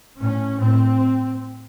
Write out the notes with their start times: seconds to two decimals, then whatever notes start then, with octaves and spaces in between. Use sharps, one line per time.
0.22 A2 C#4
0.61 A2 C4